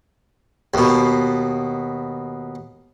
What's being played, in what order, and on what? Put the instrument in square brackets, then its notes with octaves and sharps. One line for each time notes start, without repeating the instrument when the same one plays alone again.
[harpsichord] D#2 B2